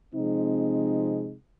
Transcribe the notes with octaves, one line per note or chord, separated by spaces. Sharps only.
C3 F3 G#3 C4 D#4